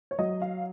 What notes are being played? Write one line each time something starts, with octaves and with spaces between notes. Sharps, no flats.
C#5
F#3 D#5
F5